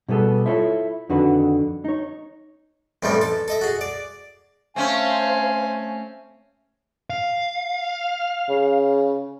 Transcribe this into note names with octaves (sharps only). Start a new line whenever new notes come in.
B2 G3 B3 G#4 A4
E4 F4 A4 B4 C#5
F2 D3 D#3 F#4 B4
D#4 C#5
F2 A2 C3 E3 G3 C#4
A4
A4 D#5 E5
F#4 G#4
D5
A3 C4 C#4 C5 F5 G#5
F5
C#3